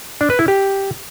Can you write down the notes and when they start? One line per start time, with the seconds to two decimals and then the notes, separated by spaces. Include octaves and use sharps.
0.21 D4
0.30 B4
0.39 E4
0.48 G4